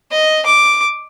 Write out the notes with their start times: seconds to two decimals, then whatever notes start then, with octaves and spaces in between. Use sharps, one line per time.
0.11 D#5
0.46 D6